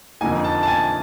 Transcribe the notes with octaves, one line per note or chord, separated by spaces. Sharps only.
F2 D3 F3 A#3 D#4 G#5
A5
A5
G#5